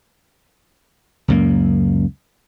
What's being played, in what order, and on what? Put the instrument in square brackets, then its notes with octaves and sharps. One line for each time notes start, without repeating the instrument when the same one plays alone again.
[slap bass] C#2 F#2 A#3